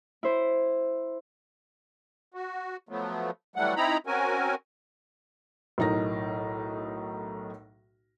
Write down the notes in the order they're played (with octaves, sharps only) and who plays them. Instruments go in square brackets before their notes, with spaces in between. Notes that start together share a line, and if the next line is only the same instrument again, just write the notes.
[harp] E4 C5
[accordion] F#4
F3 F#3 A3 B3
E3 F#3 G3 A3 F#5
C4 D#4 E4 A#5 B5
C4 C#4 F#4 A#4 G#5
[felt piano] B1 A2 D#4 A#4 A#6